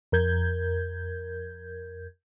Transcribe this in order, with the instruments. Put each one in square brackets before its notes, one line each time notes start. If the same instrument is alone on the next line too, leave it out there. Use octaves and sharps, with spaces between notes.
[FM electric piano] F2 A#4 G6 G#6